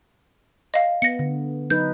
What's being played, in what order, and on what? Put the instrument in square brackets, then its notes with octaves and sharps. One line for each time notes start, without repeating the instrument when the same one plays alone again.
[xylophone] D#5 F5
[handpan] B3 [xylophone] A#6 C#7
[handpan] D3
[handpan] F#3 D#4 B4 [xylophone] G6